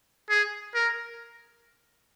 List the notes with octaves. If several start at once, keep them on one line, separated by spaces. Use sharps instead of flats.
G#4
A#4